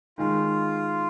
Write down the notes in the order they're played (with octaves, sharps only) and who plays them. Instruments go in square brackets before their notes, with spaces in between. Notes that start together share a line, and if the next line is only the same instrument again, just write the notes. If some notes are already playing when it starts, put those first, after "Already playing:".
[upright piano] D#3 G#3 D#4 [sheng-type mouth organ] F4